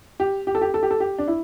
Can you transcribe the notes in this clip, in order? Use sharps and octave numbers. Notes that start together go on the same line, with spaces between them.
G4
G4
A4
G4
A4
G4
A4
G4
D4
E4